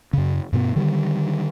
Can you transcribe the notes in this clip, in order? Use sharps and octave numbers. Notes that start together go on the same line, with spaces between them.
F#2 C#3
G2 B2 A3 B3
D3 D#3 G3